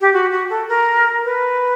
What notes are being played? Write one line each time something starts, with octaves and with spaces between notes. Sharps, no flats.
G4
F#4
F#4
A4
A#4
B4